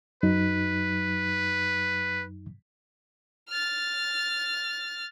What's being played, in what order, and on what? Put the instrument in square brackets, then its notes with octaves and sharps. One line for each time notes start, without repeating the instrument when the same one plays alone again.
[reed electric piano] F#2 F#3 D#4 [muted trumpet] B4
[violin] F6 A6